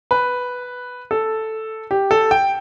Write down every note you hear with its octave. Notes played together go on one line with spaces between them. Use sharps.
B4
A4
G4
A4
G5